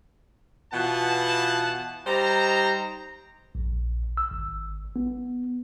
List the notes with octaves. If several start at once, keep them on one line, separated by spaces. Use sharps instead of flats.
B2 E3 B3 F4 F#5 A5
G3 D#4 C5 A#5
A#1
E6
G#1
B3